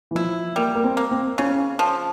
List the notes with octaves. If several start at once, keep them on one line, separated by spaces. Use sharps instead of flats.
E3
F3 E4
G3 A#3
A#3
C4
A#3
C4
C#3 C#4
F3